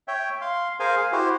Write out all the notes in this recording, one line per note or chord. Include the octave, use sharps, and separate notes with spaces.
C#5 E5 G5
F5 C6
G#4 A#4 C5 F5 G#5
G#4 F5
E4 F#4 G4 C5